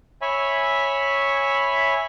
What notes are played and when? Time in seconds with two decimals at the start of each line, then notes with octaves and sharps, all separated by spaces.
0.22 C#5 E5 G#5 B5